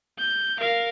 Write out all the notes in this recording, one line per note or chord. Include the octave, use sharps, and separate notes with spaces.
G6
A#4 F5